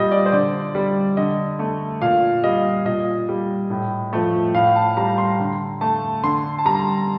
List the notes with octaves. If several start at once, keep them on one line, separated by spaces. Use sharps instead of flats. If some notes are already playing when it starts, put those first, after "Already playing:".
Already playing: A#2 G3 D#5
D5
C5
D3 D5
G3
D3 D#5
A3
A#2 F5
G3 D#5
A#2 D#5
G3
A2
F3 A3
A2 F5
A5
G3 A#5
C6
D3
A3 A5
D3 C6
A5
G3 A#5